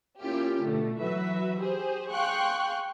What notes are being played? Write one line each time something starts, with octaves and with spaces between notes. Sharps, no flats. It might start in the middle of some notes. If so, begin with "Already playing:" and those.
A#3 C#4 E4 F4 G4
B2 D3 A3
E3 F#3 F#4 B4 E5
G4 G#4 C5
G#4 F5 G5 C6 C#6 F#6